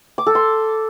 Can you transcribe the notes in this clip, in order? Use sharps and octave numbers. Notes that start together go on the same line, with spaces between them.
D6
A4
C6